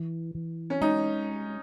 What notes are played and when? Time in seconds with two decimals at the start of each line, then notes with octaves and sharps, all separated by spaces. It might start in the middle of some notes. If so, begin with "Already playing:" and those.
Already playing: E3
0.35 E3
0.70 C#4
0.81 G#3 D#4